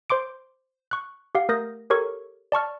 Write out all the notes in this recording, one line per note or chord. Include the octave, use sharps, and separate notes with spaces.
C5 C6 D6 D7
C#6 F#6
G4 F5 F#5
A3 A#4 D#6 G6 A#6
G4 A4 A#4 C#5 C#6
D5 A5 C#6 F6